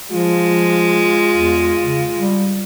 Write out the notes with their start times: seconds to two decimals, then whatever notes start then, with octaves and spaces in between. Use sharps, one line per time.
0.12 F3 G#3 F4
1.33 E2
1.83 C#3
2.15 G3